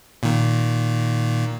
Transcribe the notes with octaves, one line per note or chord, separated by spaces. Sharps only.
A#2 D#3